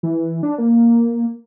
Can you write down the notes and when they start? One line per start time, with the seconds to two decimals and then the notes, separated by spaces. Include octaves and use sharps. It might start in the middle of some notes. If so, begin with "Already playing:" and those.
0.03 E3
0.43 D4
0.58 A#3